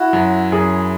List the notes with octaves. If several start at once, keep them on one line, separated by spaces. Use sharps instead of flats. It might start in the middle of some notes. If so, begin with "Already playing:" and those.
Already playing: E4 F#4
F#2
F#2 G#4